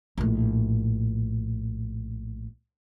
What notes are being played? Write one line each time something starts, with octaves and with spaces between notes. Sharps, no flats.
A#1 A2